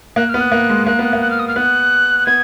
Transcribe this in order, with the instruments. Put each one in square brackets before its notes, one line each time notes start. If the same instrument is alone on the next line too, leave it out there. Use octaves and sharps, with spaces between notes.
[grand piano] A#3 [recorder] F#6
[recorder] F6
[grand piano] B3
[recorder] F#6
[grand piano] A#3
G#3
[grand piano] A#3 [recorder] F#6
[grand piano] B3
[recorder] F#6
[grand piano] A#3
[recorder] F#6
F6
D#6
F6
[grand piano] B3 [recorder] F#6
[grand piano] B3 [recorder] G#6